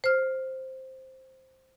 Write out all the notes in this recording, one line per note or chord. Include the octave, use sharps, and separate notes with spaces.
C5 F6